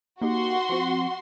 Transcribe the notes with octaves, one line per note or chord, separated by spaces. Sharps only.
A#3 D#4 F#4 G4 C6
F3 C4